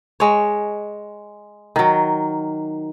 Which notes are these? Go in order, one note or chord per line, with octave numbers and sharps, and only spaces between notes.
G#3 C#5
D#3 F#3